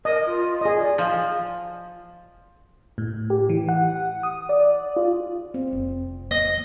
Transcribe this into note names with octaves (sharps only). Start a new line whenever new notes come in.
A#4 D#5
F4
G#4 D#5
D5
F3
A2
G4
E3
F#5
D#6
D5
F4
C4
F1
F2 D#4 D#5